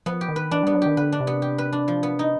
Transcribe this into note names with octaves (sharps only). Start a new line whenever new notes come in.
F3 B3
G4
D#3
B4
E3 D4
G3 B3
F#3
D#3 G4
D3 B4
D4
C3
B3
G4
B4
D4
F3
B3
D#4